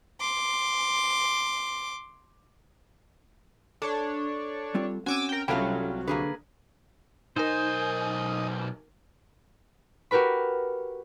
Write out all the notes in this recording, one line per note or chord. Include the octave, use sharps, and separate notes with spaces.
C6 D6
D4 A4 C#5
G3 C4 F4
C4 C#4 F#4 G#5 D6 E6
A#4 G5
C2 F#3 G3 A3 C#4 F4 A4 G5
D3 A#3 G#4 B4
B1 D#4 A#4 C5 D#5 G#5
F#4 G4 A#4 B4 B5